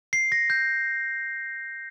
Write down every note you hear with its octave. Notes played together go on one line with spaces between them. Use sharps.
C7
A#6
G6